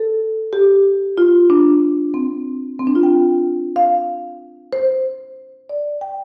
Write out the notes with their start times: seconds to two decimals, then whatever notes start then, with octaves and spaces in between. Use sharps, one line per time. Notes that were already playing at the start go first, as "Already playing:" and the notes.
Already playing: A4
0.53 G4
1.18 F4
1.50 D4
2.14 C4
2.79 C4
2.87 D4
2.95 F4
3.03 G5
3.76 F5
4.73 C5
5.69 D5
6.01 G5